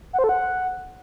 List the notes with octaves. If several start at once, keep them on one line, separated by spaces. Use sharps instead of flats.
F#5
C5
A4
F#5